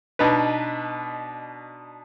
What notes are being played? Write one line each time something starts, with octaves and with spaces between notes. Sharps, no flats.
B2 D4 D#4 B4